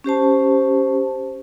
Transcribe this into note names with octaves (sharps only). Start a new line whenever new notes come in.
C#4 G4 C5 A5